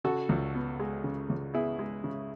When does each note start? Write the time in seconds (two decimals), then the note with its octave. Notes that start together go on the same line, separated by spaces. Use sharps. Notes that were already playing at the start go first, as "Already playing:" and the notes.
0.04 C#3 F#4 A4
0.29 C#2
0.54 B3
0.80 G#3
1.04 C#3
1.29 C#2
1.54 B3 E4 G#4
1.79 G#3
2.04 C#3